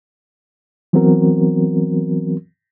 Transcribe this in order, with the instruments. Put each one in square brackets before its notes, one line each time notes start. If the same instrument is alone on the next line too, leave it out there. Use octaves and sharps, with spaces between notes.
[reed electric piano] E3 F#3 B3 C4 F#4 A#4